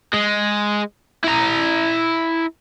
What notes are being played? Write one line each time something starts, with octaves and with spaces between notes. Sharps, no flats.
G#3
E4 A#5